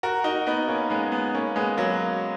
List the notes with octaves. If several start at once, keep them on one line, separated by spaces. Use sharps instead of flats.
F#4 A#4
D#4 F#4
B3 D#4
A#3 C#4
G#3 B3
G#3 B3
A#3 C#4
G#3 B3
F#3 A#3